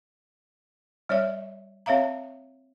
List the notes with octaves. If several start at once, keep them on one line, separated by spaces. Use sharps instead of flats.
G3 C#5 D5 E5
C4 C#5 E5 F5 A#5